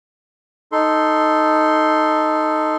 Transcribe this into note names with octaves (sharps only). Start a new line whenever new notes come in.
D#4 A4 C6